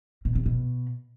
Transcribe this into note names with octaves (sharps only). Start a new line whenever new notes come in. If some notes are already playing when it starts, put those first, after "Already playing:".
B2
C3
B2